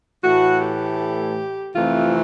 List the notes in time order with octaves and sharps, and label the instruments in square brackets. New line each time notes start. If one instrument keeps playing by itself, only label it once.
[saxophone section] A2 E3 A3 F#4
G4
F2 C3 E3 A3 F4